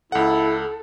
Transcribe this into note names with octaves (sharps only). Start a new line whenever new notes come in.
C#2 E4 A4 F#5